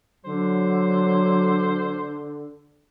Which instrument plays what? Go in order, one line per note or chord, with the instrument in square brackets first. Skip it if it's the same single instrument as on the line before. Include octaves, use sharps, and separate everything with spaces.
[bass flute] D3 [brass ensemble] F#3 [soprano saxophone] C5